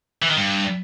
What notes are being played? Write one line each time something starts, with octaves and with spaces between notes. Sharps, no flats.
E3
D#3
G2